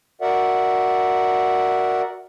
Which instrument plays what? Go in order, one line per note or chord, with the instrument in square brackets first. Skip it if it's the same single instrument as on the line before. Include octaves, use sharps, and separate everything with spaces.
[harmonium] F#4 A#4 D5 E5 F#5